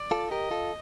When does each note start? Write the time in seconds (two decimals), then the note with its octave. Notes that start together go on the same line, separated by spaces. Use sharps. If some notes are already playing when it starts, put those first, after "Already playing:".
Already playing: D5
0.11 F4 A4
0.31 G4 A#4 D#5
0.51 F4 A4